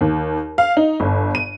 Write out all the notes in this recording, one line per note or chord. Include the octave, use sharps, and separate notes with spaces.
D#2
F5
D#4
G1
D#7